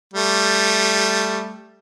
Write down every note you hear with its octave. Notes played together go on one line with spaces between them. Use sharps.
G3 A3